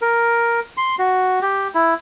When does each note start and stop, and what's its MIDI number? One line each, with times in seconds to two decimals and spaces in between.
0.02 0.60 70
0.77 0.95 84
0.99 1.39 66
1.42 1.68 67
1.75 1.94 64